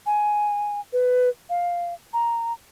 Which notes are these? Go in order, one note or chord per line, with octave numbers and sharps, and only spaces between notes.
G#5
B4
F5
A#5